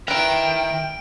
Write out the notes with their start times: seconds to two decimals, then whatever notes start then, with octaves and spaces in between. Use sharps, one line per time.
0.08 D#3 E4 B4 G5 A#5 F6 D7